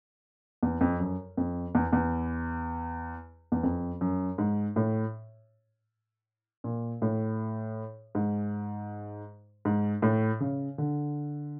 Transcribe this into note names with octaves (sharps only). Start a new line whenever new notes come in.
E2
F2
F#2
F2
E2
E2
E2
F2
F#2
G#2
A2
A#2
A2
G#2
G#2
A2
C#3
D3